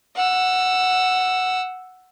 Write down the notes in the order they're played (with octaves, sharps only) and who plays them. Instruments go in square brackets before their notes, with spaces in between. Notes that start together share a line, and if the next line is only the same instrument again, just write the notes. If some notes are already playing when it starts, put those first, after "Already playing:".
[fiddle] F#5 E6